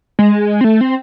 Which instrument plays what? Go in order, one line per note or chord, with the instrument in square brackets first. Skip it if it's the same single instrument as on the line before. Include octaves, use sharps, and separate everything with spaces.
[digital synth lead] G#3
C4
A3
C4